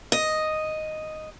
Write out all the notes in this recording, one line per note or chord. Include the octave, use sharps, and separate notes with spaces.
D#5